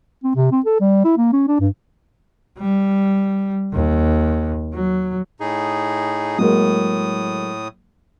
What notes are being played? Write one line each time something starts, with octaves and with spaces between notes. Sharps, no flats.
C4
C3
C4
A4
G3
E4
A#3
C#4
D4
G2
G3
D#2
F#3
A2 D#4 G#4
A2 F#3 G#3 A#3 D#6